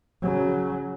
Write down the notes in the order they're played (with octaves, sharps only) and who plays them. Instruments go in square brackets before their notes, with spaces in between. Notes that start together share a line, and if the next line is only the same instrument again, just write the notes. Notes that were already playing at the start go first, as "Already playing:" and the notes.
[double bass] C#3 F#3